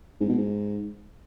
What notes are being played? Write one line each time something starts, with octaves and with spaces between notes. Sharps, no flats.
G#2
B2
G#2